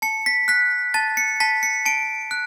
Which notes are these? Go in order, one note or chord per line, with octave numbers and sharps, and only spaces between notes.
A5 C#7
B6
F#6 B6
A5 A6
C#7
A5 B6
C#7
A5 D7
F#6